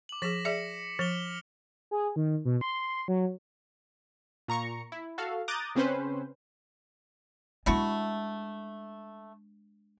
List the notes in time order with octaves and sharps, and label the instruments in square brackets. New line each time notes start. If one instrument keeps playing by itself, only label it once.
[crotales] D6 F#7
[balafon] F3 G#4 [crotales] A#6 B6 E7
[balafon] G#4 D5 E5 [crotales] C#7
[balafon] F3 [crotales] F6 F7 G7
[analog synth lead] G#4
D#3
B2
C6
F#3
[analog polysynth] A#2 A#5 C#6 C#7
E4
F#4 A4 F5
A#5 D6 D#6 F#6 G6 A6
C#3 C4 C#4 B4 C5
[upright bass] G#3 D4 [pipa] A3 E4 F#4